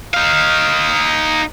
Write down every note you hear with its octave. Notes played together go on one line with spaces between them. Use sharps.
D#4 F5